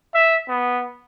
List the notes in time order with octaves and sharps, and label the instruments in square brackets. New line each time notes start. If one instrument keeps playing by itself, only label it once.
[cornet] E5
B3